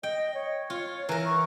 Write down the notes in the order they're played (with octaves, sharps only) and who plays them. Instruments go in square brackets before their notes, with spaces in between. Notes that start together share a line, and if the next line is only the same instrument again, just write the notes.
[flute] D#5 [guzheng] G5
[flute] C#5
[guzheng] F4
[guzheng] E3 A#4 [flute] A#5
[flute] C#6